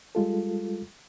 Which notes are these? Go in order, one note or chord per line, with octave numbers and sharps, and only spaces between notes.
G3 G#3 F4 A4